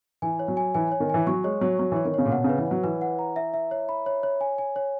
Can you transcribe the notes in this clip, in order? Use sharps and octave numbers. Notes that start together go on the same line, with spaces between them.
E3 G#5
C#5
F#3
G#5
E3 G#5
C#5
D#3
E3 G#5
F#3 C#6
G#3 C#5
F#3 C#5
F#3 C#6
E3 C#5
D#3
C#3 C#5
A#2
B2 F#5
C#3
B4
E3
F#3 F#5
E3 B4
F#5
A#5
E5
E5
C#5
B5
C#5
C#5
G#5
G#5
C#5